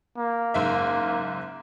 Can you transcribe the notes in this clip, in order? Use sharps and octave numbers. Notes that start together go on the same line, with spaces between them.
A#3
F#1 G#2 E5